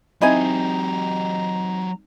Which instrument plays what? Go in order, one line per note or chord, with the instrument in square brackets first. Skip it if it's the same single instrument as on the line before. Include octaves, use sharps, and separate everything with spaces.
[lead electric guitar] F#3 G4 [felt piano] C4 D#4 [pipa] E4 D#5 G#5 [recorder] A#5